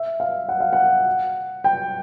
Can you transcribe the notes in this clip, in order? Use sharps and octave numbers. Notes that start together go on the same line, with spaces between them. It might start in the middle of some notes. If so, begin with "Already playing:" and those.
Already playing: E5
F5
F#5
F5
F#5
G5